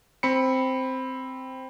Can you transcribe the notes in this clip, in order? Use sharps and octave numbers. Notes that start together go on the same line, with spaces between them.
C4 B5 C#7